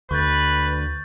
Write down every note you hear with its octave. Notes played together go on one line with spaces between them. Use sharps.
D2 B4 C#6 G6 A6